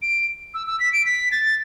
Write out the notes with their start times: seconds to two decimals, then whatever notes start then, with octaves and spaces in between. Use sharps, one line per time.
0.02 D7
0.54 E6
0.67 E6
0.80 B6
0.93 D7
1.06 B6
1.32 A6